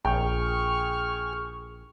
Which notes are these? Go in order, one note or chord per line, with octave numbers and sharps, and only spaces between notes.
A#1 G#4 G5 C#6 F6